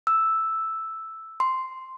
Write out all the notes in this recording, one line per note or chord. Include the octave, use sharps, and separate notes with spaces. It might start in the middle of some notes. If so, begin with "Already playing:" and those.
E6
C6